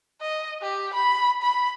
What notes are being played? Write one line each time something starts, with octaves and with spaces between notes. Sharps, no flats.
D#5
G4
B5
B5